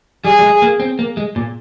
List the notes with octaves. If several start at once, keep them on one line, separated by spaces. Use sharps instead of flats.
G3 G#4
G3
G#3
A#3
C4
A#3
G#3
A#2